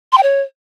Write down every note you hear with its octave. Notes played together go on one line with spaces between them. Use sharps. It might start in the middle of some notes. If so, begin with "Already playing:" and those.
C6
G5
C#5